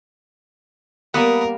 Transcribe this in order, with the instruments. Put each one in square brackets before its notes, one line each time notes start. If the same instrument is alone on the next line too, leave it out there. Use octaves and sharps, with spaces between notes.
[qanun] G3 A#3 B3 [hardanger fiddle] A#4 [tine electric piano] F#5 B5 D#6